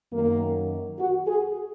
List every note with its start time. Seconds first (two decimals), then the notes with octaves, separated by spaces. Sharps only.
0.13 F#2 D#3 A#3
0.99 F#4
1.28 G#4